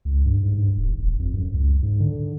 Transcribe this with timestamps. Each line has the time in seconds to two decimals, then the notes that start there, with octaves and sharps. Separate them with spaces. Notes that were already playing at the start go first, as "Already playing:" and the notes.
0.05 C#2
0.25 G2
0.43 G#2
0.58 G2
0.77 D#1
0.88 G1
1.00 E1
1.20 F2
1.34 F#2
1.54 C#2
1.83 G#2
2.00 D3